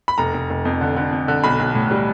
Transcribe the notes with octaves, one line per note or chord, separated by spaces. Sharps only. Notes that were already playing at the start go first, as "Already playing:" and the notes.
B5
F1 A#5
F1
F1
F2
D3
D3
F2
D3
B1 B5
B1
A2
G3